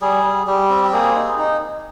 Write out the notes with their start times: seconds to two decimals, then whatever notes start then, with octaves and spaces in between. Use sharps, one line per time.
0.02 G3 G#4
0.24 G3
0.47 G3 G4
0.70 C4
0.85 G4
0.93 A#3 G#4
1.16 D#4
1.39 D#4